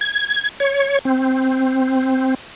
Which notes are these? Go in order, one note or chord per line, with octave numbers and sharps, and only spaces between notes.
G#6
C#5
C4